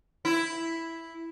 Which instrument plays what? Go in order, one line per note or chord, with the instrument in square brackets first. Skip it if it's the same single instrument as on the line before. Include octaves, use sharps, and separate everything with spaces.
[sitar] E4